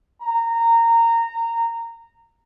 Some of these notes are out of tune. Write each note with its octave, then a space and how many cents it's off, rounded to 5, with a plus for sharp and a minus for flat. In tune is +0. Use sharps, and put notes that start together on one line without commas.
A#5 -20